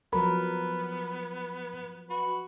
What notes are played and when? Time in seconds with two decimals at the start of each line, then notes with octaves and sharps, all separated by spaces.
0.13 F3 F#3 B3 A#4 B5
2.10 F#4 B4